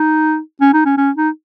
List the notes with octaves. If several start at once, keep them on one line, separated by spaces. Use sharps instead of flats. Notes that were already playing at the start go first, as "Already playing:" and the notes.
Already playing: D#4
C#4
D#4
C#4
C#4
D#4